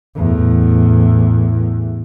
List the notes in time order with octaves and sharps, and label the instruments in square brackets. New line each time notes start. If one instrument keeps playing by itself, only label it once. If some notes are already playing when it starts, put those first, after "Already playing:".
[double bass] E2 A2